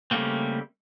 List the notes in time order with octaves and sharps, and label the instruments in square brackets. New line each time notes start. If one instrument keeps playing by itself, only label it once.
[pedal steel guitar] C#3 G3 A3 A#3 C4